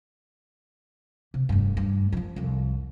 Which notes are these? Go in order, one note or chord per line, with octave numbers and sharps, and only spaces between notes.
C3
F1 G2
G2
E3 F3
C2 F2